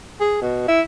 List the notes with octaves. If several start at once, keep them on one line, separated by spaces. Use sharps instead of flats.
G#4
B2
E4